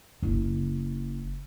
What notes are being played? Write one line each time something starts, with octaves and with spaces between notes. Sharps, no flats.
F#1 E4